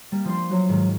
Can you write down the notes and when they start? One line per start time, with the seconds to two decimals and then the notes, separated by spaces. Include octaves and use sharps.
0.12 G3 A#3
0.25 F3 D4 C6
0.51 F#3 F#4
0.69 G#2 D#3